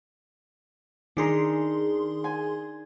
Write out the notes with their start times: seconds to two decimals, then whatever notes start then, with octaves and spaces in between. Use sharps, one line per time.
1.17 D#3 D4 D#4 G#4 A#4 C6
2.24 G#5